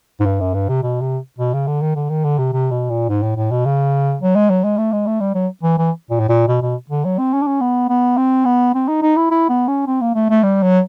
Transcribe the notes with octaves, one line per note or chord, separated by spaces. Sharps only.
G#2
G2
F#2
G2
C3
B2
C3
B2
C#3
D3
D#3
D3
D#3
D3
C3
C3
B2
A#2
G#2
A2
A2
B2
C#3
F#3
G#3
F#3
G#3
A3
G#3
A3
G3
F#3
E3
E3
A#2
A2
A#2
B2
B2
D3
F#3
C4
C#4
D4
C#4
B3
B3
C4
B3
C4
D#4
D#4
E4
E4
B3
C#4
C4
A#3
A3
A3
G3
F#3